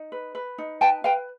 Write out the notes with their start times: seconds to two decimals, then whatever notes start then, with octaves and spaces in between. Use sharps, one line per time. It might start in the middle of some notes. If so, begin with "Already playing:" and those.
Already playing: D#4
0.12 B4
0.35 B4
0.58 D#4
0.81 B4 G5 A5
1.04 B4 F5 G5